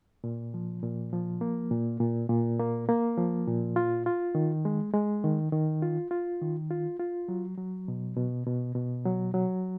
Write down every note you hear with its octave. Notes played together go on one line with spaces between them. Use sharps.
A#2
F3
A#2
F3
A#3
A#2
A#2
A#2
A#3
A#3
F3
A#2
F4
F4
D#3
G#3
G#3
D#3
D#3
F4
F4
D#3
F4
F4
F#3
F#3
B2
B2
B2
B2
F#3
F#3